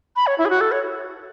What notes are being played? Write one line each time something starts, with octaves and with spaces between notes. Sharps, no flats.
B5
C#5
E4
G#4
F#4
A4
C#5